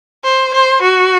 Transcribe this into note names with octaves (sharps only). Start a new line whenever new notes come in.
C5
C5
F#4